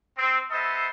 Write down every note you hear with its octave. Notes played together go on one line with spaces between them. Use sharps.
C4
B3 A4 C5 D#5 E5